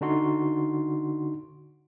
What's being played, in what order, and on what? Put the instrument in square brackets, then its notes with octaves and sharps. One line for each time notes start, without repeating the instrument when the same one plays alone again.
[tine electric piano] D3 D4 D#4 F#4 C6